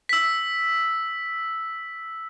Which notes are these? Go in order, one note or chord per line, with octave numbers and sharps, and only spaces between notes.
E6 B6